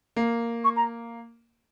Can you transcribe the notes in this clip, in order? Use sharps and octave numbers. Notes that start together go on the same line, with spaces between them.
A#3
C#6
A#5